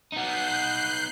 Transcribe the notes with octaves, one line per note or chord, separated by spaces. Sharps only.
B3 D#4 F#6 G6 C7